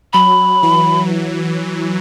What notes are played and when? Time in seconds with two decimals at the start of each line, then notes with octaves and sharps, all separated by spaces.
0.13 F#3 B5
0.63 E3